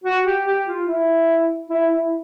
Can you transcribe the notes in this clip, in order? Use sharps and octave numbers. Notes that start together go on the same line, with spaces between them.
F#4
G4
G4
F4
E4
E4
E4